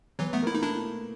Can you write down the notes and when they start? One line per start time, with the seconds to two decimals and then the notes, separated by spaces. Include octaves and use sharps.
0.19 E3 F#3 B3
0.33 A3 B3
0.43 A#3
0.47 A3 E4
0.55 D#4
0.63 D4 E4